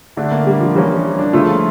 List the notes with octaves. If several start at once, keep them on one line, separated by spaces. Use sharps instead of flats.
D3 A3 D4 E4
A#3
G3
F3
E3 G3 A#3 C#4
D4
C#3 F3 A3 E4 F4